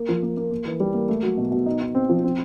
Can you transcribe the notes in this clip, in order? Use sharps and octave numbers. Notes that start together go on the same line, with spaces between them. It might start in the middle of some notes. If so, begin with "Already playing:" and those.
Already playing: A#3
F3
A#3
A#3
A#3
E3
G3
A#3
A3
F#3
B2
B2
D#4
D#4
C4
F3
C4